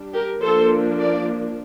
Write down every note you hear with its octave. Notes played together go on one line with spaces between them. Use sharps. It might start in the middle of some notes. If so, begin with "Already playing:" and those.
Already playing: G3 D4
G4 A#4
F3 A#3 D4 A4 C5
A#4 D5